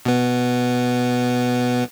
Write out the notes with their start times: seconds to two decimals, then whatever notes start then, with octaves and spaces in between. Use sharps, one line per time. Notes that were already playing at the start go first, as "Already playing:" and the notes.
0.05 B2 B3